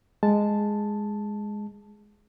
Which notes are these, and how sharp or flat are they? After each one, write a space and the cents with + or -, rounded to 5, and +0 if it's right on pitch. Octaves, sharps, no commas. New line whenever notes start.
G#3 +0 A5 +0